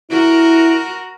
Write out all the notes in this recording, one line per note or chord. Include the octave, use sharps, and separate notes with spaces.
E4 F#4 A#4